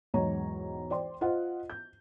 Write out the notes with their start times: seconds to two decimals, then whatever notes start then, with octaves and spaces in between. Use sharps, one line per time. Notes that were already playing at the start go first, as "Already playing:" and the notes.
0.14 B1 E2 G#2 C#5 A#5
0.90 C5 D5 G5 C6
1.21 F4 C5 D#5 F#5
1.70 G6